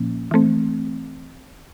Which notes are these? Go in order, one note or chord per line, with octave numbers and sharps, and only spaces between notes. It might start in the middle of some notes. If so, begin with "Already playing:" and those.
Already playing: A#2 F3 A#3 C#4
E3 A3 C4